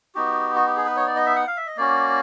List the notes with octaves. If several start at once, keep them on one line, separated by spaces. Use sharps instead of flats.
B3 D#4 F#4 G4
F#4
G4
G#4
B4
C#5
D5
D#5
E5
F#5
F5
E5
D#5
A#3 C#4 F#4 D5